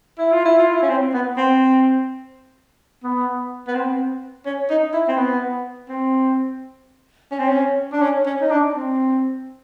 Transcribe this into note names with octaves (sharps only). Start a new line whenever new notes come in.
E4
F4
E4
F4
E4
C#4
C4
B3
C4
B3
B3
C4
C#4
D#4
E4
C4
B3
C4
C#4
C4
C#4
D4
C#4
C#4
D#4
D4
C4